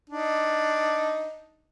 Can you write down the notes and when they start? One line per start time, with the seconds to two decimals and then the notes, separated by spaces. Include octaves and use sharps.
0.10 D4 D#4